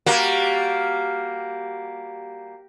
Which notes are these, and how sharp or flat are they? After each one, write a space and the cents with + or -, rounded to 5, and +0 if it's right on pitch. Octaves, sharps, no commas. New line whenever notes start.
G3 -5 A#3 +0 F#4 +0